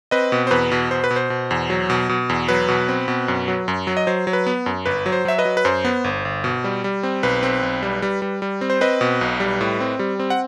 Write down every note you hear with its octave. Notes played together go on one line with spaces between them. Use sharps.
C4 B4 D#5
B2
C5
E2 B4
B2
B2 C5
B4
B2
C5
B2
E2
F#3
B2
B2
E2
F#3 B4
B2
C4
B2
F#2
F#3
F#2
F#3
D#5
F#3 C5
F#3
B4
B3
F#2
G1 B4
F#3
C5
F#3 E5
B4 D#5
F#3
B4
F#2 C5
B3
G1
G1
B2
G3
G3
C4
B1 B4
C4
B1
G3
G3
G3
G3
C4
C5
C4 B4 D#5
B2
B1
G3
A2
C4
G3
C4
F#5